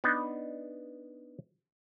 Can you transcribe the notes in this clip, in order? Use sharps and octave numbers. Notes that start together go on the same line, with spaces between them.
B3 D4 D#4